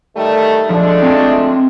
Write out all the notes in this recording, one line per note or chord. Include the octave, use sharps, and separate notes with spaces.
D#3 G3 A3
F3 G#3 A3 D4
C4 F4 G5